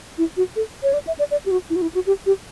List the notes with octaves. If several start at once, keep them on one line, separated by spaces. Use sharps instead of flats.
E4
F#4
A4
C#5
D5
E5
D5
D5
G4
F#4
E4
F#4
E4
F#4
G4
G4